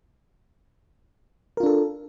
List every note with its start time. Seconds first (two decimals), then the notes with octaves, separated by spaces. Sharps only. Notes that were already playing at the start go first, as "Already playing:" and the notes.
1.57 A#4
1.60 F4
1.63 D4
1.66 A4